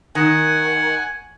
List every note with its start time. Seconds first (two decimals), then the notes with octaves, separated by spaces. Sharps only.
0.15 D#3 F#5 G#5